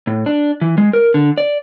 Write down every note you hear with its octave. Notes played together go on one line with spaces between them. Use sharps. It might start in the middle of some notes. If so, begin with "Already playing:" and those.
A2
D4
E3
G#3
A#4
D3
D5